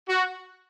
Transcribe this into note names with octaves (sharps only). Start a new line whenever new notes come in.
F#4